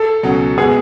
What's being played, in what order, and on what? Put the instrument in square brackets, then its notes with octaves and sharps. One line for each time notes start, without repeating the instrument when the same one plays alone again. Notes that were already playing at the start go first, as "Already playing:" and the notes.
Already playing: [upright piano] A4
[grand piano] C#2 B2 F#3 C#4
[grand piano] B2 G#3 B3 [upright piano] G#4